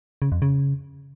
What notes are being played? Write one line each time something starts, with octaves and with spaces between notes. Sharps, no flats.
C#3
F2
C#3